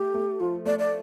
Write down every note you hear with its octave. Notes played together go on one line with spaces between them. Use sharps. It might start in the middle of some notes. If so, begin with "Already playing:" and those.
Already playing: A3 G4
A3
F3 F4
A3 D5
D5